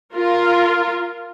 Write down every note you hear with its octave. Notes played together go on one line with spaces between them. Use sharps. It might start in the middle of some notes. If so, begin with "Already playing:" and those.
F4 A#4